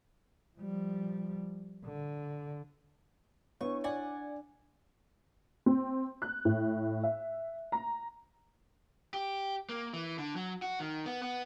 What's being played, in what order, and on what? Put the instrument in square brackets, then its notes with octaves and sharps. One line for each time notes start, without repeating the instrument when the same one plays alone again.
[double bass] F3 G3
D3
[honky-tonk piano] B3 [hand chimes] D4 E4 C#5 [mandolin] C#6
[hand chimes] D4 [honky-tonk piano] D5 [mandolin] F#5 G#5
[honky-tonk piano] C4
F#6
A2
E5
A#5
[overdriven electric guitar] G4
A#3
E3
D3
F#3
F#4
D#3
B3
B3